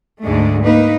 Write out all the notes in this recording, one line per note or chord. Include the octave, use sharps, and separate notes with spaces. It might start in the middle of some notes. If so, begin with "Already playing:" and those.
D2 G#2 D3 G#3 A3
A#3 D#4 B4